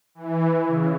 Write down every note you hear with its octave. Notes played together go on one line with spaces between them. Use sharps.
E3
C#3